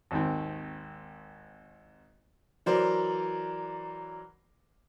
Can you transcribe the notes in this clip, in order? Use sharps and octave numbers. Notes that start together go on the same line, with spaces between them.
G#1 D#2 D#3 C4
E3 F#3 A#4 C5 D5